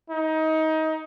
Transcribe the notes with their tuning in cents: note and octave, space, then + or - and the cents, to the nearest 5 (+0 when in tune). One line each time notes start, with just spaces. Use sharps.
D#4 +25